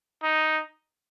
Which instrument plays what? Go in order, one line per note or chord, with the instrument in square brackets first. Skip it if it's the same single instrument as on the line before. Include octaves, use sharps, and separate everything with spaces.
[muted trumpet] D#4